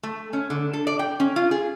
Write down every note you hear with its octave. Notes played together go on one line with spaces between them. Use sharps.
A3
C#4
D3
A4
D5
G5
C#4
F4
G#4